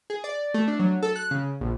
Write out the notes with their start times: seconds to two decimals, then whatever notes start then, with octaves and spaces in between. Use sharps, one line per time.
0.10 G#4
0.24 D5
0.54 A3
0.68 D4
0.79 F#3
1.03 A4
1.16 F#6
1.31 C#3
1.61 A#1